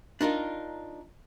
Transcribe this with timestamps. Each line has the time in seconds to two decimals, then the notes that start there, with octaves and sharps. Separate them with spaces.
0.21 D4 D#4 F4 A#4